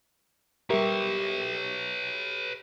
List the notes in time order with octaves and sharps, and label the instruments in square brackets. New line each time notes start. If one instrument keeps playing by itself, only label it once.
[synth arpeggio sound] G3 A#4 [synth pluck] G4 E5 [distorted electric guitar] B4 C#5